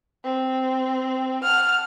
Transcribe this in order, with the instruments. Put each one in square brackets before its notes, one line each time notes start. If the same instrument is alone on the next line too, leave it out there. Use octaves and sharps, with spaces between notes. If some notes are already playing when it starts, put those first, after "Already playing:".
[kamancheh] C4
[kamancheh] F#5 A5 [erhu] F6